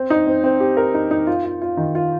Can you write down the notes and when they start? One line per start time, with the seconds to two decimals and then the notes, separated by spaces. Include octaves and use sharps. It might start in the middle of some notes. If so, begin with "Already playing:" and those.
Already playing: C4
0.10 D#4
0.27 C4
0.44 C4
0.60 G4
0.77 A#4
0.94 D#4
1.11 D#4
1.27 F4
1.44 F4
1.62 F4
1.77 D#3
1.95 F4